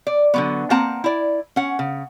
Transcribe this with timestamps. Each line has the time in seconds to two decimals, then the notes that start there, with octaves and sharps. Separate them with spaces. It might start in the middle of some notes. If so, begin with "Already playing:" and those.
0.07 D5
0.34 D3 F#3 B3
0.70 A#3 C4 F#5 A5 A#5
1.04 E4 D5
1.56 C#4 F#5
1.79 C#3